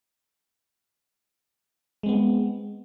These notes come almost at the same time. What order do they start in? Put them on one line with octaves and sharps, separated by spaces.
G#3 C4 B3